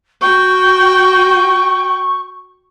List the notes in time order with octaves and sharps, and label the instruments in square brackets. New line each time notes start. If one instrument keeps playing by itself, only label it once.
[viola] F#4 G5 [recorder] C#6